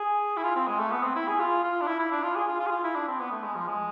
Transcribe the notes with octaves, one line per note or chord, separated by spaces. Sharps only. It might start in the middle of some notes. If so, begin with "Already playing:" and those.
Already playing: G#4
E4
F4
C4
G#3
A3
B3
C4
E4
G#4
F4
F4
D4
E4
E4
D4
F4
G#4
F4
F4
G#4
F4
E4
D4
C4
B3
A3
G#3
F3
G#3